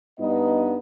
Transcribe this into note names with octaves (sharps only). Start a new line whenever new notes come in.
G2 B3 D#4 D#5